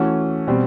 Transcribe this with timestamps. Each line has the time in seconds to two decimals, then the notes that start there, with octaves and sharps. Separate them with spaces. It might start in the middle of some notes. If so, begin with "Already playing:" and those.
Already playing: E3 A3 C#4 F#4
0.47 B2 G3 C4